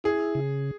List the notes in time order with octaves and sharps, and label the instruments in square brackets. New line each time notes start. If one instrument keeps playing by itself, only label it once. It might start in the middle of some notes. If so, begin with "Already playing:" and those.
[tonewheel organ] E4 [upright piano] G#4
[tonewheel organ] C#3